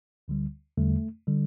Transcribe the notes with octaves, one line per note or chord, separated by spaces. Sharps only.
D2 D3 G3
E2 D3 G3 A3
D3 G3